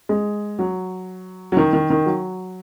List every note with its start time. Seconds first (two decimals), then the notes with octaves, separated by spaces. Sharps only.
0.09 G#3
0.59 F#3
1.52 F#3
1.57 D#3
1.73 D#3
1.90 D#3
2.06 F#3